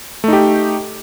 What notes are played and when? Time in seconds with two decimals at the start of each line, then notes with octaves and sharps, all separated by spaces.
0.24 A3
0.28 D#4
0.33 G4